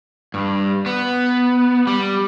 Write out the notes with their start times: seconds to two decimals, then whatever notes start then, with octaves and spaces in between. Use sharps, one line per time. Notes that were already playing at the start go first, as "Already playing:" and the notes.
0.34 G2
0.86 B3
1.87 G3